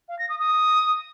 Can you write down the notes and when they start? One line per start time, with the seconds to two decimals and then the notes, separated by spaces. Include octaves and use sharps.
0.09 F5
0.19 A#6
0.29 D#6
0.39 D#6